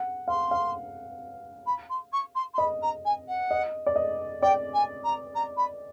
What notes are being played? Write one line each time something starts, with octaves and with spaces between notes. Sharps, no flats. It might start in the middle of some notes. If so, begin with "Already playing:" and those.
Already playing: F#5
F5 C6
F5
B5
C6
C#6
C6
C6
D#5 B5
A#5
G#5
F#5
D#5
D5
D#5
D5 G5
G#5
A#5
A#5
B5